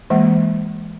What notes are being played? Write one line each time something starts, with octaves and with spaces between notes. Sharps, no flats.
E3 G#3 A#3